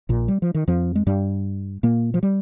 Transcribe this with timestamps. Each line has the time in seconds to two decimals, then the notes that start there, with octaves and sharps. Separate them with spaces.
0.09 A#1 A#2
0.28 G3
0.42 F3
0.54 D#3
0.68 F2 F3
0.95 G#3
1.07 G2 G3
1.83 A#2 A#3
2.14 F3
2.23 G3